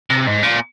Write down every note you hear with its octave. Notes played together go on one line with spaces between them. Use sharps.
C3
G#2
A#2